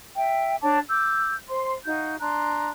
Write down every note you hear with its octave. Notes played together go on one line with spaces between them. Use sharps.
E5 G5
D4 C#5 A5 D6
D6 E6 G6
C5 C6
D#4 F#4 F5 G6
D4 A#5 C6 F#6